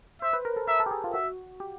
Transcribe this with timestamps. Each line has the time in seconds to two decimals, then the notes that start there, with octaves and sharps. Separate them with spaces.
0.22 C5 E5
0.33 B4
0.45 A#4
0.56 A4
0.68 A#4 E5
0.80 A4
0.86 G4
0.91 G#4
1.04 F4
1.14 F#4 E5
1.60 G4